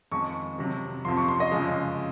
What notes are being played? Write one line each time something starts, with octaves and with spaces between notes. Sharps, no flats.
F2 D#3 G#3 C#6
F2 C3 F#3
F2 C3 F3 C6
C#6
C6
D#5
F#2 C#3 F3 G#3